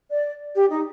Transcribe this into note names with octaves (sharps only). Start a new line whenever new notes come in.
D5
G4
D#4